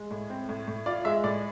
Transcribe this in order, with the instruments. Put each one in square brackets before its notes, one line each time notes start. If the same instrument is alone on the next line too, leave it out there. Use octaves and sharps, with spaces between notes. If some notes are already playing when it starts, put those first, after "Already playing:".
Already playing: [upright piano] G#3
A2
C4
A2
A2
F4 D5
G#3 E5
A2 D5